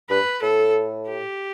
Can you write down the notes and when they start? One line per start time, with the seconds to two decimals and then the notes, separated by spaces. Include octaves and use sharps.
0.10 G2 B4
0.42 A2 A4
1.09 G4